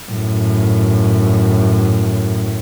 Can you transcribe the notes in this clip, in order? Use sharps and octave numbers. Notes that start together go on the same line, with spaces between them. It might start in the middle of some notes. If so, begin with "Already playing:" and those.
F#2 A2